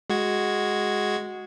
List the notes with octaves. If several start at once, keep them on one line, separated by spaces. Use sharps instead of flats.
G#3 F#4 G#6